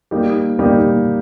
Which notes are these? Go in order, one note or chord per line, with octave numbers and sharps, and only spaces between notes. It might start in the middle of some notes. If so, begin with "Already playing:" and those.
G3 A#3 D#4 G4
G3 A#3 D#4 G4